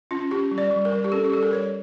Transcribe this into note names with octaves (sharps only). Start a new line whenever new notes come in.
C#4 F4
C#4 G4
G3
D5
G3
A#4
G3
G4
C#4 A4
G4
G3 A4
A#4
G3 C#5